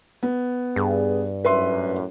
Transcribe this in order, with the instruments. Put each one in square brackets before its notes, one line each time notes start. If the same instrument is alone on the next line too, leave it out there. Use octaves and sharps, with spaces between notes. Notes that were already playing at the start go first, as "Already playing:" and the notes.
[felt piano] B3
[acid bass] G2 [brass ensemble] G#4
[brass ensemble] F#2 A2 [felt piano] B4 E5 C6